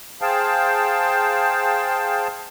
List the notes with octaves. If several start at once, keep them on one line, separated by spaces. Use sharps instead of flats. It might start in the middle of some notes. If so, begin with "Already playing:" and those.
G#4 C5 F5 G5 A5